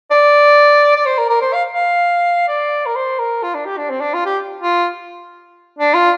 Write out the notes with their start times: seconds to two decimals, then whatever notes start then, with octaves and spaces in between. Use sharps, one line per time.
0.11 D5
0.96 D5
1.06 C5
1.18 A#4
1.29 A#4
1.42 C5
1.53 F5
1.71 F5
2.48 D5
2.86 A#4
2.95 C5
3.19 A#4
3.43 F4
3.54 D4
3.66 G4
3.77 D4
3.90 C4
4.01 D4
4.14 F4
4.25 G4
4.61 F4
5.79 D4
5.94 F4